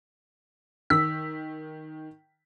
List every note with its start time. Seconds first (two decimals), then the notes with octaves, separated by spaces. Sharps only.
0.90 D#3 E6 B6